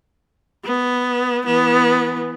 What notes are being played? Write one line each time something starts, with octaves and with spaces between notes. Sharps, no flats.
B3
E3 B3